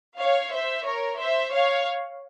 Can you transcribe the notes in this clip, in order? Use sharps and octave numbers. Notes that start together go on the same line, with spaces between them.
C#5 F5
C5 E5
A#4 C#5
C5 E5
C#5 F5